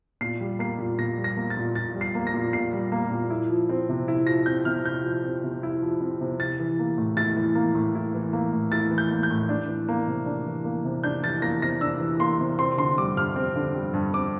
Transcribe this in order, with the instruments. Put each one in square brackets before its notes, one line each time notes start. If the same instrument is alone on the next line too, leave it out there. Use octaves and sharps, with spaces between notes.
[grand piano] A#2 C7
G3
A#3 C7
A#2
A#2 A#6
G3
A#6
A#3
A6
A#2
A#2 A6
G3
C7
A#3
A#6
A#2
A#2 C7
G3
A#3
A#2
E4
F3
C4
C3
E4
F3 A#6
C4 G6
C3 F6
E4 G6
F3
C4
C3
E4
F3
C4
C3
E4 A6
E3
A#3
A2
E4 A6
E3
A#3
A2
E4
E3
A#3
A2
E4 A6
E3
G6
A#3
G6
A2
D4
E3
A#3
C3
D4
E3
A#3
C3
D4 G6
E3 A6
A#3 A#6
C3 A#6
D4 E6
E3
A#3 C6
C3
C4 C6
D3 C6
G3 D6
G2 F6
C4
D3
G3
G2
C4 D6